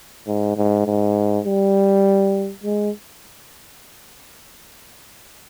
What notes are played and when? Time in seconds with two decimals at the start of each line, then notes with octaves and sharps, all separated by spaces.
0.27 G#2
0.57 G#2
0.86 G#2
1.46 G3
2.64 G#3